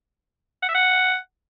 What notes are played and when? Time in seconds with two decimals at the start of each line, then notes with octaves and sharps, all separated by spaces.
0.63 F#5
0.69 E5
0.75 F#5